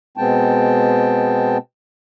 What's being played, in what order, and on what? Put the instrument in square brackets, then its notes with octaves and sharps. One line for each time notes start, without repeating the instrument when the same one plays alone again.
[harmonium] B2 G#3 B3 C4 G5 A5